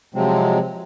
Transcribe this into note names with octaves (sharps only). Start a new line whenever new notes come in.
C3 F3 F#3 G#3 C4